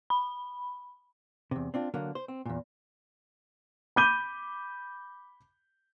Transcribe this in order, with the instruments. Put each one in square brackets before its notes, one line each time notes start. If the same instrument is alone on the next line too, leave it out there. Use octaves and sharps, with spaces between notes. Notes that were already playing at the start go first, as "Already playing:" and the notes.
[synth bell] B5
[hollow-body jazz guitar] E2 C3
C4 D4 F4
D3 F#3 A#3
C5
C4
E2 A#2
[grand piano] B5 D6 G6 D#7 G7